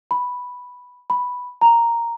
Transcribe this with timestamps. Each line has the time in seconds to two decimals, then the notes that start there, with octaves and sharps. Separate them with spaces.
0.11 B5
1.10 B5
1.61 A#5